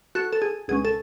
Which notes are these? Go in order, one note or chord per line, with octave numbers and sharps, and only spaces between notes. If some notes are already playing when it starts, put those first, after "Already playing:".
F#4 A4
A4
G#4
C#2 B2 G#3 C#4 G#4
A4